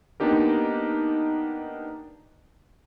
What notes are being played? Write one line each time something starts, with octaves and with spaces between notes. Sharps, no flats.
A#3 B3 D4 D#4 G4 A#4